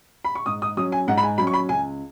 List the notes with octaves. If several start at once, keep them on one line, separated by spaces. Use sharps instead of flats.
B5
C#6
G#2 D#6
D#6
F#3 C#4 D#6
G#5
G#2 F#5
B5
G#5
F#3 C#4 B5
C#6
B5
C#2 G#5